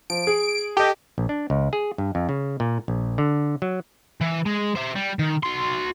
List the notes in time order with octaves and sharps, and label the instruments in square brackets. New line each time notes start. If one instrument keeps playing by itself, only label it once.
[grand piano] F3 [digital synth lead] D7
[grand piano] G#4
[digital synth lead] G4 [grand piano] A4 D#5
[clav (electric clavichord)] A#1
D4
C#2
G#4
G2
F2
C#3
A#2
A#1
D3
F#3
[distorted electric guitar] E3
G#3
C5 E5
G3
D#3
F#4 C6